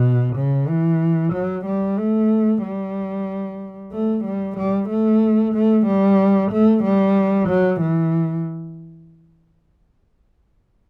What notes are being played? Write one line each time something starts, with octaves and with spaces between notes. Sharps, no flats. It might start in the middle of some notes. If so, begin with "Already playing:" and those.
Already playing: B2
C#3
E3
F#3
G3
A3
G3
A3
G3
G3
A3
A3
G3
A3
G3
F#3
E3